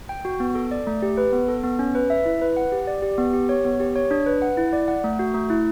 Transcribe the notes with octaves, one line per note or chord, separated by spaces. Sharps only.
G5
F#4
B3
A4
D5
A3
G4
B4
B3
A4
B3
C#4
B4
E5
E4
B4
F#5
G4
D5
G4
B3
G4
C#5
B3
G4
C#5
D4
B4
F#5
E4
D5
F#5
A3
F#4
A3
E4